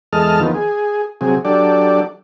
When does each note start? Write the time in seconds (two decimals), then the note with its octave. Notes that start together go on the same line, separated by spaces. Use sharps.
0.13 E2 G#3 A4 D#5 A5 F6
0.40 D#2 D#3 F3 B3
0.55 G#4
1.21 C3 F#3 G#4
1.45 F#3 D4 G4 A4 D5